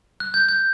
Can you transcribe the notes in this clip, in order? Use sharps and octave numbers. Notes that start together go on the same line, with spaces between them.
F#6
G6
G6